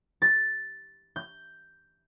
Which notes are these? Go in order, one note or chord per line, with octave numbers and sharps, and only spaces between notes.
A6
G6